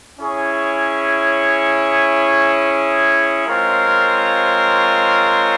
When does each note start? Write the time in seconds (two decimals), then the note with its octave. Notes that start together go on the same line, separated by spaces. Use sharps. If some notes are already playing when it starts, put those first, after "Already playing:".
0.19 C#4 E4 G#4 C#5
3.47 G#3 C4 F4 A#4 C#5